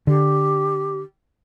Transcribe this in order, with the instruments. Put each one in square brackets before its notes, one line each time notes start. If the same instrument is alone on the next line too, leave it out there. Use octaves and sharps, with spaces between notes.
[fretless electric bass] D3 [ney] G4